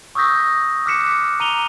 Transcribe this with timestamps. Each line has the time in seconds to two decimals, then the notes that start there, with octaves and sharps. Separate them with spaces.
0.15 C#6 D#6 E6 G6 A#6 B6
0.86 D6 F6 F#6 B6 C#7 E7
1.40 A#5 D#7 F7 G7